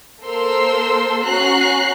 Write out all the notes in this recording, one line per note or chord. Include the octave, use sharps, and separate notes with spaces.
A#3 A4 A#4 C5 C6 E6
C#4 F#4 A#5 F#6 C7